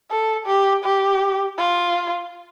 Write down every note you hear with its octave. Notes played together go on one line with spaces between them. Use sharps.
A4
G4
G4
F4